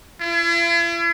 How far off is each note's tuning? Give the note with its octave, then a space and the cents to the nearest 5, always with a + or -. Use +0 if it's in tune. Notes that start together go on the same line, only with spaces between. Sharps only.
E4 +45